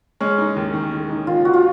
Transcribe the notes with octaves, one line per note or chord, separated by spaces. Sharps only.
G#3 C#4
D#4
D#2
D#3
G#3
D#4
D#2 F4
D#3 F#4
F4